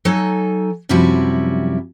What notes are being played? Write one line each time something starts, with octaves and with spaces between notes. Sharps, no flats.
F#3 D#4 A4 G#5
F#2 C3 F3 G3 E4 F#4